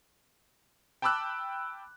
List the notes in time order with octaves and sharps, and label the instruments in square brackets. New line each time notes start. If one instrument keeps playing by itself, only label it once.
[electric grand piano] G5 A5 B5 D6 E6 F#6